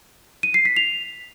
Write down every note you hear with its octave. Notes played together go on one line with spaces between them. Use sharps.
D#7
C7
B6
F7